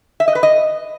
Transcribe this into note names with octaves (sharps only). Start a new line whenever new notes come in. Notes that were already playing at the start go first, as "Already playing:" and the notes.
E5
D#5
B4
D#5